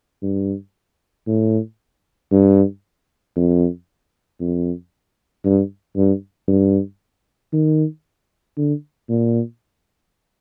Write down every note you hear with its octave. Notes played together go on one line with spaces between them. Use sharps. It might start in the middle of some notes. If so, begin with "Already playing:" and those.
G2
A2
G2
F2
F2
G2
G2
G2
D#3
D3
A#2